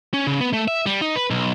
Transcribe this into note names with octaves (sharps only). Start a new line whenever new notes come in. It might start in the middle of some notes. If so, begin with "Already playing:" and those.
C#4
C#3
B3
A3
E5
G3
D#4
B4
B1